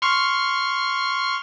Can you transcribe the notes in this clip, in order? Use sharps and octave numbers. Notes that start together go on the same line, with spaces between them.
C6 C#6 F6